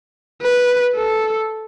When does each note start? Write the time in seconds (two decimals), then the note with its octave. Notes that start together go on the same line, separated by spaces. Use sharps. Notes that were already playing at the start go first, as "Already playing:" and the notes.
0.42 B4
0.97 A4